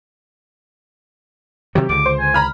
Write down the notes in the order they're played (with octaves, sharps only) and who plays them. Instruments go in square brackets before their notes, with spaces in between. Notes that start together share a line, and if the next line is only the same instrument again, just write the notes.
[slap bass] C3 D#3 F#3 [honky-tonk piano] G4
[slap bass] C#2 D3 [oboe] D6
[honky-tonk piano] C5
[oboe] G#5
[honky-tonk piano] A#5 B5 F6